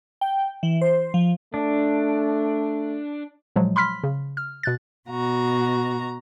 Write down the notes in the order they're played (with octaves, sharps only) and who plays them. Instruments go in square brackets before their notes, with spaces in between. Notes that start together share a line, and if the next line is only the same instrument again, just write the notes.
[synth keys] G5
E3
C5
F3
[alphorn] A3 [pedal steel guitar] D4
[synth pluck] A#2 F3 F#3 G#3
B5 C6 F6 B6
C#3
F6
B2 F#6 A6
[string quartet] B2 F#4 A#5